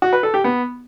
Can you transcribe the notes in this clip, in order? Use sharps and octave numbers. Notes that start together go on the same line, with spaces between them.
F#4
B4
A4
G4
B3